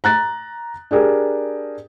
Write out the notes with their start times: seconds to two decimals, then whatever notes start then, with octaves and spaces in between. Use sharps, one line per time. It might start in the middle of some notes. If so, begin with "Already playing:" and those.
0.04 A#5 F#6 A6
0.91 D4 G4 G#4 A#4